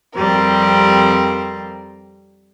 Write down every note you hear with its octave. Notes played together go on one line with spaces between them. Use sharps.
F2 G3 C4 A#4